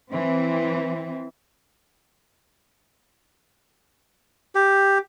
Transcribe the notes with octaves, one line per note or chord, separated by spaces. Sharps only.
E3 C4
G4